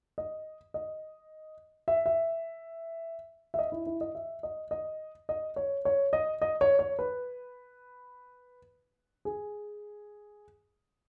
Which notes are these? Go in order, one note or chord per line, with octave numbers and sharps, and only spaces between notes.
D#5
D#5
E5
E5
E5
D#5
E4
E4
D#5
E5
D#5
D#5
D#5
C#5
C#5
D#5
D#5
C#5
C#5
B4
G#4